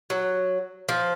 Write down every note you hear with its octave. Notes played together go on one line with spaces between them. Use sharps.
F#3
F3